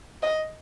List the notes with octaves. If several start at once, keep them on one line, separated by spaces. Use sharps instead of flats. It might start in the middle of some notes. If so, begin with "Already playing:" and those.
D#5